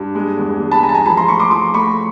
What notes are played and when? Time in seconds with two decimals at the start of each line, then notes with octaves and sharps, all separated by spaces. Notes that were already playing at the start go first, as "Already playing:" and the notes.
Already playing: G2
0.15 G#3
0.38 E2
0.60 E2
0.71 A5 B5
0.83 G#3 G#5 A#5
0.89 A5
0.94 G#5 A#5
1.06 F3 A5 B5
1.17 A#5 C6
1.28 A3 B5 C#6
1.39 C6 D6
1.51 F3 C6 D6
1.74 A3 B5 C#6